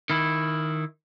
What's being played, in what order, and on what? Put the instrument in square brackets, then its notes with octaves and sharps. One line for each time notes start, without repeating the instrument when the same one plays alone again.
[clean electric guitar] D#3 E4